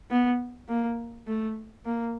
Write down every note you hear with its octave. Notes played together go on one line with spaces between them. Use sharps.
B3
A#3
A3
A#3